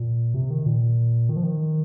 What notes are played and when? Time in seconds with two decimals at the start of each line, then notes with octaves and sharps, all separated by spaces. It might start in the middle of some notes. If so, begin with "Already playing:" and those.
Already playing: A#2
0.34 C3
0.50 D#3
0.66 A#2
1.29 D#3
1.37 F3
1.43 D#3